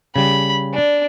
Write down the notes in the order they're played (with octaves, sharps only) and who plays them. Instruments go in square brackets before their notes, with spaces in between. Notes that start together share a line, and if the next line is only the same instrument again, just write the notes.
[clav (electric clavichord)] C#3 G3 [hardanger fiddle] B5
[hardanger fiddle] D4